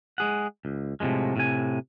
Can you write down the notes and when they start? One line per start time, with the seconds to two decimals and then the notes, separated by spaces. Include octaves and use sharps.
0.18 G#3 G#4 F#5
0.65 C#2
1.00 A2 C3 E3 F3 G#3
1.36 A2 C3 G#5